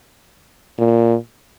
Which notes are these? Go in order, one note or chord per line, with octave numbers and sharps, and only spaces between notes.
A#2